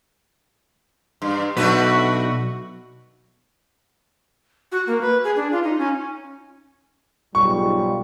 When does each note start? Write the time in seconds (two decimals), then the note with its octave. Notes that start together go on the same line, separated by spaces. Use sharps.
1.22 G2
1.57 B1 A3 D4 F#4 B4
4.72 F#4
4.87 A#3
5.01 B4
5.24 G#4
5.36 D4
5.52 F4
5.63 D#4
5.79 C#4
7.35 B1 G#2 G3 F4 C#6